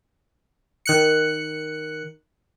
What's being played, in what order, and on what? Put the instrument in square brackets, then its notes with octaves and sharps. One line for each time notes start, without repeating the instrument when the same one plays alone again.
[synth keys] D#3 F#6 C#7